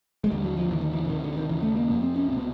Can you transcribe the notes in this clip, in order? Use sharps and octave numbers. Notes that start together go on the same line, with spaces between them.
G#3
D#2 D3 G3
F#3
F3
D#2 D3 E3
D#3
E3
D3
D2 C3 D#3
D3
D#3
D#2 C#3 E3
A3
A#3
F2 C3 A#3
C4
C#4
C#2 C3 B3 C4